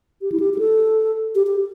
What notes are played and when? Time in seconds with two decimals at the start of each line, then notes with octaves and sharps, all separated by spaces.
0.22 G4
0.32 E4
0.40 G4
0.54 G4
0.58 A4
1.35 G4
1.47 G4